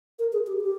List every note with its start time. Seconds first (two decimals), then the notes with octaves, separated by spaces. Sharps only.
0.19 A#4
0.33 G#4
0.47 G4
0.61 G4